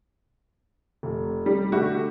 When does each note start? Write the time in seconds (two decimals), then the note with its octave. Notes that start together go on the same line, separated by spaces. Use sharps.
1.03 F1
1.46 G3
1.72 D3 A3 F#4 G4